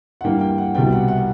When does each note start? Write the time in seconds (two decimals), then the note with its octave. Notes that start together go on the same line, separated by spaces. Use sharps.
0.21 F#5
0.24 G2 E3 G3 A#3 G5
0.41 G5
0.58 F#5
0.75 C2 B2 G3 B3 G5
0.92 F#5
1.08 F#5